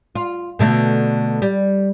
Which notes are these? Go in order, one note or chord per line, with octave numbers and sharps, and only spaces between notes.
F4
B2 D3 A3
G3